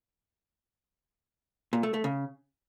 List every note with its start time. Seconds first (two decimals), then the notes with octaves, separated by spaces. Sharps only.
1.73 A#2
1.83 A3
1.94 A3
2.04 C#3